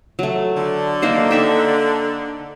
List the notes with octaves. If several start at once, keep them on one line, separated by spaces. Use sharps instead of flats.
F#3 A3
D3
A#3 D#4 C5
D#4 E5 G5